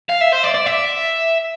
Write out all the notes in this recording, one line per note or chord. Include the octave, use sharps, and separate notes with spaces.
F5
E5
C5
D5
D5
E5